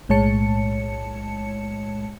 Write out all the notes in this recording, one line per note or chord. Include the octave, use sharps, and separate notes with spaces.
B1 A2 G#3 C#5 A5 C#7